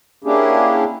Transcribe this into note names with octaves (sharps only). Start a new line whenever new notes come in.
A#3 C#4 D4 E4 G4 G#4